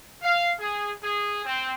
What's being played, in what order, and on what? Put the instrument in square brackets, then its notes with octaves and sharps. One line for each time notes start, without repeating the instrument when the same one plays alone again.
[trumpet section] F5
G#4
G#4
C4